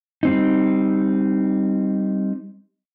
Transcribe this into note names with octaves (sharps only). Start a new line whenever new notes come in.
G3 C4 D#4